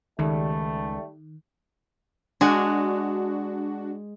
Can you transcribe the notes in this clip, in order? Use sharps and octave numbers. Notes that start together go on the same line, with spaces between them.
C#2 D#3 G3 A3
G#3 D4 F#4